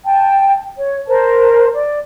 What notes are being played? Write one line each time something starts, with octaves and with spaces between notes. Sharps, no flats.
G5 A5
C#5
A#4 C5 A5
D5